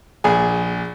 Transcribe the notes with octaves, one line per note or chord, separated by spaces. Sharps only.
A#1 G#4 G#5